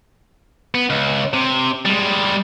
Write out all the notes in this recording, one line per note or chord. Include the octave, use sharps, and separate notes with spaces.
B3
C#2
C3
G3 G#3